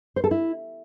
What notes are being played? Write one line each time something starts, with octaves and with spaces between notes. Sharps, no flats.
C5
A4
E4